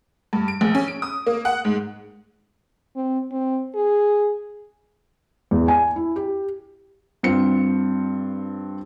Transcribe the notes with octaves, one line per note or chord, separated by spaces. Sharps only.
G2
D7
A#1
C#4
D7
D#6
A#3
F#5
G#2
C4
C4
G#4
E2
G#5
E4
G4
G2 C4 F4 C#7